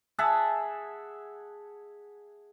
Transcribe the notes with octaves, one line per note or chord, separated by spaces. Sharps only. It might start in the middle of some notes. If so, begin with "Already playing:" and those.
G#4 E5 F#5 A5